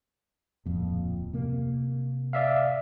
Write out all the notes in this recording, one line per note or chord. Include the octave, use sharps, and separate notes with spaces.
D1 F2 A#2
C3 A#3
D5 E5 F5